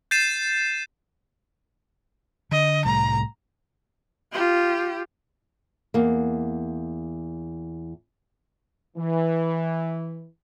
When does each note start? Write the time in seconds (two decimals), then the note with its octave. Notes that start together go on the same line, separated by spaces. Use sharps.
0.11 G6 A6 C7 D#7 E7
2.52 D3 D#5
2.85 C2 A2 G3 A#5
4.33 F4 G4
5.94 E2 A#3
8.97 E3